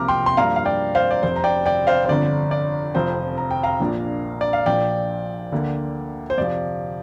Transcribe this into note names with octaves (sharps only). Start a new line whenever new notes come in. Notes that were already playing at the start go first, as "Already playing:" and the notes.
Already playing: C2 C3 F3 A#3 A#5 D6 F6
G5 C6
C6
G2 F3 A#3 D4 F5 A#5
F5
D5 G5
C5 F5
D5
F1 F2 C3 C5
A#5
D5 G5
D5 G5
C5 F5
C5
G1 F2 D3 D5
D5
F1 F2 F3 C4 C5
A#5
G5
F5 A#5
A#1 A#2 A#3 D4
D5
F5
A#1 A#2 F3 D5 G5
D2 D3 A#3
C5
F2 C3 F3 D5